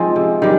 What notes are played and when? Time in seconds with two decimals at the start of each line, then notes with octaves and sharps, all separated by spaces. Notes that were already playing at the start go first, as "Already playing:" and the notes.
Already playing: F3 G#3 C4 D#4
0.16 C3
0.42 D#3 G3